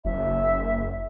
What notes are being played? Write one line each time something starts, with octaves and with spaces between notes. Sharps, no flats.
F#1 E5